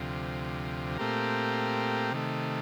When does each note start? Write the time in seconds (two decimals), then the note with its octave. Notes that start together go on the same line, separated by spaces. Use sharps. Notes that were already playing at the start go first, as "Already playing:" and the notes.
Already playing: D2 C3 F3
0.98 A#2 A3 C4 G4 A#4
2.12 C3 D#3 A3